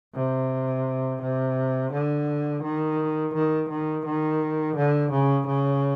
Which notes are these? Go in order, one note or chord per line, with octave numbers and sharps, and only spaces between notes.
C3
C3
D3
D#3
D#3
D#3
D#3
D3
C#3
C#3